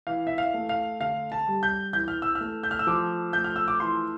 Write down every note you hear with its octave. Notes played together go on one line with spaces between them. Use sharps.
E3 F5
E5
F5
A3
F5
D3 F5
A5
G3
G6
E3 G6
F6
E6
F6
A3
G6
F6
E6
F3 D6
A3 G6
F6
E6
D6
E3 C6